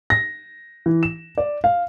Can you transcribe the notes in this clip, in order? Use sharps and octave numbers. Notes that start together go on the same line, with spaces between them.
A#6
E3
E7
D5
F5